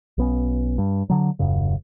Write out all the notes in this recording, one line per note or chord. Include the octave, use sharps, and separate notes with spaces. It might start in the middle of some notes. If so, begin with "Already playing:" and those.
B1 B3 C#4
G2
D3 F#3
D#1 F#2 C#3